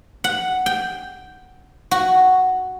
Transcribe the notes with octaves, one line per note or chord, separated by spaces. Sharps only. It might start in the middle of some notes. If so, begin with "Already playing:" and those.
F#5
G5
F#4